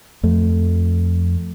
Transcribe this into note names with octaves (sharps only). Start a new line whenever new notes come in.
F2 A3